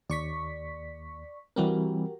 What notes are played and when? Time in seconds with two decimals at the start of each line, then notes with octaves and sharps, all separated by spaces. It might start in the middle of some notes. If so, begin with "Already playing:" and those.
0.10 D#2 D5 C#6 B6
1.56 E3 G3 C4 F#4 G4 A#4